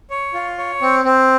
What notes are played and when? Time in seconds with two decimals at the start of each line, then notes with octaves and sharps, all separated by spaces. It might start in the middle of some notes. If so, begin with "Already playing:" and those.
0.10 C#5
0.34 F4
0.58 C#5
0.82 C4
1.05 C4